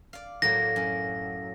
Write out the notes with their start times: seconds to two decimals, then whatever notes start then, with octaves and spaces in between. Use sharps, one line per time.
0.13 D5 F5
0.42 A2 F#3 A#3 A#6
0.76 F#2